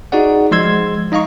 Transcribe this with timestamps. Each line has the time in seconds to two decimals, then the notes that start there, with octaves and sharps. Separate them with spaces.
0.12 D#4 F#4 G#4 D5 F#5
0.51 F3 G#3 C6 E6 G#6
1.12 D#4 D#5 F5 A#5 C#6